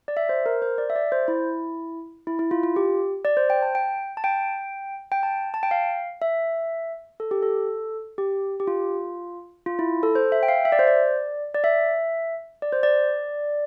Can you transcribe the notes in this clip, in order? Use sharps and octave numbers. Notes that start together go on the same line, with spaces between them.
D5
E5
C5
A#4
C5
D5
E5
D5
C5
E4
E4
E4
F4
F4
G4
D5
C5
G5
A5
G5
A5
G5
G5
A5
A5
G5
F5
E5
A4
G4
A4
G4
G4
F4
F4
E4
A4
C5
E5
G5
F5
E5
D5
C5
D5
D5
E5
D5
C5
D5